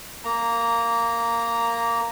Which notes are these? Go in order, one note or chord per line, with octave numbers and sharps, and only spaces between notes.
A#3 A#5